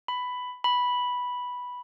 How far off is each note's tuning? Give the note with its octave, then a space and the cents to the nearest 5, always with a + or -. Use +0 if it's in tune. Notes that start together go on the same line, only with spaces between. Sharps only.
B5 +10
B5 -5